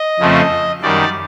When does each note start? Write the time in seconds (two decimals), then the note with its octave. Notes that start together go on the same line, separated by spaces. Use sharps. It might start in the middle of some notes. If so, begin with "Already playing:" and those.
Already playing: D#5
0.19 F2 C#3 F3 A3 C4
0.82 F#2 D#3 G3 D5